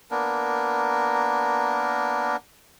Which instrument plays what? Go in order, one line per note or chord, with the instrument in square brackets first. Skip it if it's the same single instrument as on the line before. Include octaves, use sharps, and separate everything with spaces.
[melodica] A#3 B3 D4 A#4